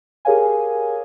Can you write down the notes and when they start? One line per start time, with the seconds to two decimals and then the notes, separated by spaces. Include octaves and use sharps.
0.25 G4 G#4 A#4 C#5 F5 G#5